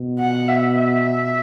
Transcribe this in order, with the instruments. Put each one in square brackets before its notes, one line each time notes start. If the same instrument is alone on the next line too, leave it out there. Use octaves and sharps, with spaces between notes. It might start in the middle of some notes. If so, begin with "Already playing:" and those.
Already playing: [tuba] B2
[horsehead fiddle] F#5
E5
E5